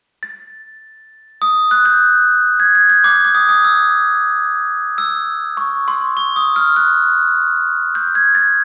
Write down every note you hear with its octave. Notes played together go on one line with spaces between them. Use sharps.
A6
D#6
F#6
G6
G#6
G#6
G6
D6
D6
D#6
D#6
E6
E6
C#6
C6
C#6
D#6
F6
F#6
G6
G#6
A6